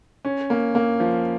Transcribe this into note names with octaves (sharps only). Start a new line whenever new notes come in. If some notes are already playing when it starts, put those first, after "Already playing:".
C#4
A#3
A#3
F3